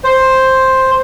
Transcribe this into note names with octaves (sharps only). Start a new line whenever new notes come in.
C5